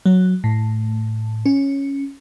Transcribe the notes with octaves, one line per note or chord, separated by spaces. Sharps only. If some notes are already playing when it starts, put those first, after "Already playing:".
F#3
A2
C#4